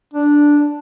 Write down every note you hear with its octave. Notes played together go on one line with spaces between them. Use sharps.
D4